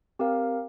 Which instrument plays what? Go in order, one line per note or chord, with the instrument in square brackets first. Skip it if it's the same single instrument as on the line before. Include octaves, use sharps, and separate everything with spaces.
[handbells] C4 G4 A#4 F5